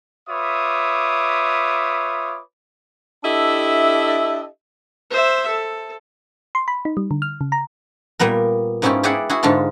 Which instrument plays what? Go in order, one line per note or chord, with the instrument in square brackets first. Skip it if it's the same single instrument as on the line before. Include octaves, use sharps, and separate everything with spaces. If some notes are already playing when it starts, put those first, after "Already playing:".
[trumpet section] F4 B4 C#5 E5 D6 D#6
[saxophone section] D4 E4 G4 A4 D#5 E5
[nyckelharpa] C5 E5
A4
[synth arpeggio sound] C6
B5
D#4
G3
D3
F6
C#3
A#5
[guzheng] A#2 G3 B3 A#4
G#2 B3 C#4 E4 F4 G4
E4 G4 G#4 D5 E5 F#5
E4 F#4 G#4
G#2 D3 F4 A5 C6